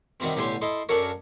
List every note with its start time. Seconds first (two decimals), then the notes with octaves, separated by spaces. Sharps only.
0.20 C3 D#3 F#3 G3 C4
0.36 B1 A2 D3 G4 G#5 C6
0.61 E4 A4 D#5 C6
0.89 F#2 D4 F#4 A4 A#4 C#5